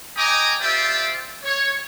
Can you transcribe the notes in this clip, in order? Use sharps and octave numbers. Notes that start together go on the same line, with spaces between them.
D#5 G5 G#5 A#5 D6 D#6
F4 G4 C5 D5 E5
C#5